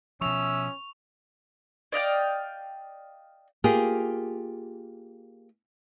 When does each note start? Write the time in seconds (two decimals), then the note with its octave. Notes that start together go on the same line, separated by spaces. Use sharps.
0.21 B2 F3 C#4 E5 C#6 D#6 E6 F7
1.92 D5 D#5 F5 G5
3.64 A#3 F4 G4 G#4